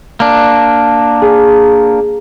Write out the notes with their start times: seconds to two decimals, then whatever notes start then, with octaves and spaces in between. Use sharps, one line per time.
0.20 A#3 D4
1.22 G#4